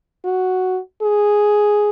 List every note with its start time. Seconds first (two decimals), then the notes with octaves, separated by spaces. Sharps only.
0.25 F#4
1.02 G#4